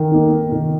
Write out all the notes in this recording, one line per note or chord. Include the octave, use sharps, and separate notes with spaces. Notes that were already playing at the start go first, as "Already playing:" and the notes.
Already playing: D#3 A#4
A#3 D#4
D#3